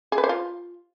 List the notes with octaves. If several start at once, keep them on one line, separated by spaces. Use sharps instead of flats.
G#4
B4
C5
F4